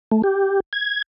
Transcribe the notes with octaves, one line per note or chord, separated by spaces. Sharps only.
A3
G4
G#6